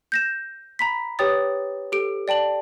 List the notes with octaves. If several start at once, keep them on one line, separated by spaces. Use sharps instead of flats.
G6 A#6 E7
A#5 B5 B6
G4 B4 C#5 G5 D#6 A6
G4 A4 D7
D5 G5 A5 F#7